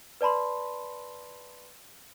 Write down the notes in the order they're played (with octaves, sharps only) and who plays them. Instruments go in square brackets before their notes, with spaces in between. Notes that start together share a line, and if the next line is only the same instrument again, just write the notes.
[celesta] B4 D5 A5 B5 C6